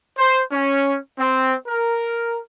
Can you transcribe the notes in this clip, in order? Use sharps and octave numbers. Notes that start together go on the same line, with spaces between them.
C5
C#4
C4
A#4